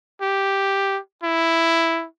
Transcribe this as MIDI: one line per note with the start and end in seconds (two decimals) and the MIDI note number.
0.22 0.99 67
1.24 2.06 64